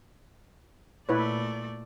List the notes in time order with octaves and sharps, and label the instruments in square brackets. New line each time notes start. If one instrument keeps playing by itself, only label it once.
[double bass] A#2 [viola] A3 D5 [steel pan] E4 B4 C#5